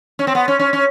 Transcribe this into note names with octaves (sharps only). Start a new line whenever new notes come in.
C#4
C4
B3
C#4
C#4
C#4